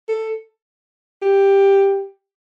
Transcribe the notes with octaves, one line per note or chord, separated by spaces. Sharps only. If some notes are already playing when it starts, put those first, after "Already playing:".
A4
G4